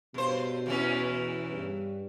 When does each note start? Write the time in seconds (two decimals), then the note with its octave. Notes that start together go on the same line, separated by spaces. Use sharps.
0.14 G2 B2 C5
0.66 E2 E3 C#4
1.51 G2